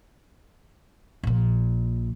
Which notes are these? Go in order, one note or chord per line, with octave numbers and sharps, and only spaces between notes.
A#1 A#2